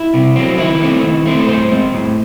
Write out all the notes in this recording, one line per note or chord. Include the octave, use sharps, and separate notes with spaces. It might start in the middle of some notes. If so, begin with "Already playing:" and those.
Already playing: E4
C3
F#3 C4
D#3 E4
A3 C4
D#3
A3 C4
A2 C5
G#3 C4
A2